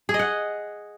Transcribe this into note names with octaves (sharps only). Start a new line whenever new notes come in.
G#4
D#5
F#5